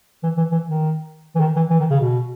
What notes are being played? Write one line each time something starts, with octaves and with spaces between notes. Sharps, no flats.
E3
E3
E3
D#3
E3
D#3
E3
E3
D#3
C#3
B2